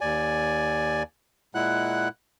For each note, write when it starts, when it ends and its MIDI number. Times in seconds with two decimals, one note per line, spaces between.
0.01 1.03 39
0.01 1.03 74
0.01 1.03 80
1.55 2.08 46
1.55 2.08 56
1.55 2.08 64
1.55 2.08 78
1.55 2.08 90